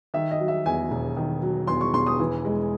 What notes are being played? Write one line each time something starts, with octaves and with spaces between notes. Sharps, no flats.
D#3 E5
D#5
F#3
E5
E2 G#5
E1
D#3
F#3
E2 C6
C#6
E1 C6
D#6
E3
G#3